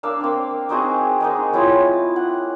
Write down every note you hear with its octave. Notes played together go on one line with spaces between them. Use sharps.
A#3 D4 F5 E6
A#3 C4
C4 D#4 F#4 G#4
G#3 A#3 D#4
F#3 E4 F4 D#5
F#5